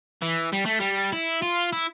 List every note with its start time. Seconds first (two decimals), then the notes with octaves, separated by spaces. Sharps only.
0.22 E3
0.53 G3
0.66 A3
0.80 G3
1.12 E4
1.42 F4
1.73 E4